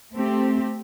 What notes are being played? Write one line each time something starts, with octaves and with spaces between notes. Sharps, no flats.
A3 C4 G4